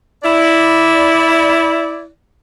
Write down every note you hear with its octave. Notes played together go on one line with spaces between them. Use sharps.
E4 D5